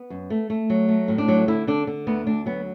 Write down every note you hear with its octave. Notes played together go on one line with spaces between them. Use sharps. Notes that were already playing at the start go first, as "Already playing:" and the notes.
Already playing: B3
F#2
A3
A3
F#3
A3
A2
D4
F#3
D3 E4
D3 D4
D3
D2 B3
D2 D4
F#3 B3